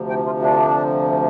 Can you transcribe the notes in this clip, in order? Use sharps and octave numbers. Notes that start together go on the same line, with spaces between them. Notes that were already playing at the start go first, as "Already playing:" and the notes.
Already playing: D2 C3 F3
G5
F4
D4